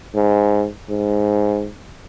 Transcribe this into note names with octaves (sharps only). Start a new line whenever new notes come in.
G#2
G#2